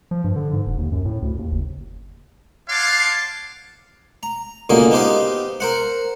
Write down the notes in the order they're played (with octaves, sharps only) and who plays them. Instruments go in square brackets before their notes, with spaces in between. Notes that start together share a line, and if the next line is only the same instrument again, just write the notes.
[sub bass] F3
G2
D3
G#2
E1
D#2
F#2
A2
D2
D#2
F#1
[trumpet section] C#5 F5 F#5 A5 C6 D6
[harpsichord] A#5
C#2 B2 D3 A#3 G#4 A#4
B3 D#4 G4 C5 F5
A#4 C5 F#5